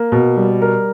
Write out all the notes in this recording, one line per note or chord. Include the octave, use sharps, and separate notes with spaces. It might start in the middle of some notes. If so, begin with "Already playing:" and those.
Already playing: A#3
B2
G3
A#4